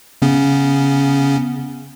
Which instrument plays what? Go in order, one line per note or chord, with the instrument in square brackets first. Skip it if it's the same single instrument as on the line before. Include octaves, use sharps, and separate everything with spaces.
[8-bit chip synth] C#3 B3 C#4